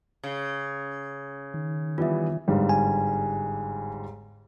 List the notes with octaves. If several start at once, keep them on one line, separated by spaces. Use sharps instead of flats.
C#3
D#3
E3 G3 B3 F4 E5
G1 G#2 G3
G#5